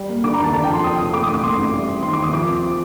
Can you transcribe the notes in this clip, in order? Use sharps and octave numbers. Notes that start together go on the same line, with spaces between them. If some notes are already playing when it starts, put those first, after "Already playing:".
Already playing: G3
A#3
D3 D6
A#5
D#2 A5
D3 A5
G5
F3 C6
F2 D#6
F1 D#6
A3 D6
D#6
A1
D6
A2 C6
A1
G3
C4
D#3 C6
D6
D#2
D#6
F3 D6
C4